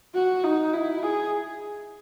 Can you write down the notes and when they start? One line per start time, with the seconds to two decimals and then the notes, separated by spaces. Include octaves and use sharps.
0.14 F#4
0.44 D#4
0.73 E4
1.03 G#4